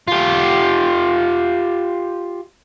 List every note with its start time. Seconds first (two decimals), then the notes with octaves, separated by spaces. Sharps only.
0.08 F4 G4